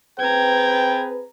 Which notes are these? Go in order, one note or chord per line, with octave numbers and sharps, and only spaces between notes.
C4 G#4 B4 G5 A#5 G#6